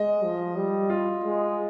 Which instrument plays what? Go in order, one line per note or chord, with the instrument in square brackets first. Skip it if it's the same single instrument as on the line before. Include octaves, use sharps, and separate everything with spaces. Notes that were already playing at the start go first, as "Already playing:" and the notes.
Already playing: [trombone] G#3 [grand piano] D#5
[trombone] F3
G3
[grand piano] F4
[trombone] G#3